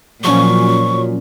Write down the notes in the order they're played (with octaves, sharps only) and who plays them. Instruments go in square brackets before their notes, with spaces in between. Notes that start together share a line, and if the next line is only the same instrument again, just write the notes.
[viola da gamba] A#2 [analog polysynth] F3 F#3 C#4 [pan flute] C#6